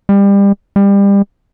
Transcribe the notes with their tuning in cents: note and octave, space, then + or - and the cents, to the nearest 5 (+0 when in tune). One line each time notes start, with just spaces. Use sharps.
G3 +30
G3 +30